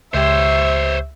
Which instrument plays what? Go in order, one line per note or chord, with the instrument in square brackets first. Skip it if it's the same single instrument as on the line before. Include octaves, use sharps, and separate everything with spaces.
[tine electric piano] C#2 G4 [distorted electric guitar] C5 C#5 [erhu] E5